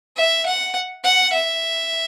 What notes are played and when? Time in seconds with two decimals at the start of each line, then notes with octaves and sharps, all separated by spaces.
0.17 E5
0.46 F#5
1.03 F#5
1.33 E5